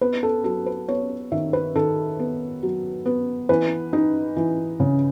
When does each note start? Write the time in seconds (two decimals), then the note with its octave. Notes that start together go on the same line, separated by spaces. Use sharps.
0.01 B3 B4
0.23 A4
0.44 F#3 A4
0.66 B4
0.88 B3 C#5
1.32 D#3 E5
1.53 B4
1.75 D#3 A4
2.19 B3
2.63 F#3
3.06 B3
3.49 E3 B4
3.93 D#4
4.36 E3
4.80 C#3